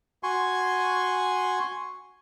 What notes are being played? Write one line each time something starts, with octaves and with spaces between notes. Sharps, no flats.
F#4 G#5 C6 C#6